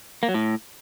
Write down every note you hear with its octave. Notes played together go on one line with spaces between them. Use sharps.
A#3
F#3
A2